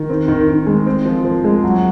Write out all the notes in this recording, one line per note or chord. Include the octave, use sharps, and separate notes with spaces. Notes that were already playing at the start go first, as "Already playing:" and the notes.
Already playing: D#3
C4
D#3
D#3
G#3
C4
F3
F3
G#3
F#3